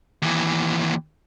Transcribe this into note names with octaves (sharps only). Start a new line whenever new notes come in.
D#2 E3